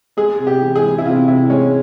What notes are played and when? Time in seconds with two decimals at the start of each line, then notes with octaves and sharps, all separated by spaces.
0.17 G#3 G#4
0.39 C3
0.47 G4
0.62 E3
0.76 G#4
0.83 G#3
0.98 E4
1.05 C3 F4
1.28 C3 E4
1.50 G#3 C#4